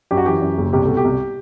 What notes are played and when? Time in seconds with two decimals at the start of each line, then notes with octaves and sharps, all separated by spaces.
0.11 F#2 G4
0.17 F#4
0.26 E3 G4
0.42 F#2
0.58 F#1
0.73 C2 G4
0.85 B2 A4
0.97 G4
1.05 C2